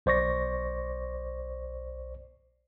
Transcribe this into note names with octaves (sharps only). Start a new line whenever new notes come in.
B1 C5 D5 C#6 A#6